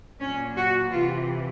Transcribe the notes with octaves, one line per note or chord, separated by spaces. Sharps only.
A#2 F#3 C#4
F#4
C3 E3 F4